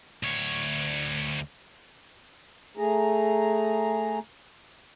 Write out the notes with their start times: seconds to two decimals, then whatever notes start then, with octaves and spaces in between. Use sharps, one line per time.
0.23 D2 C#5
2.77 A3 G#4 A#5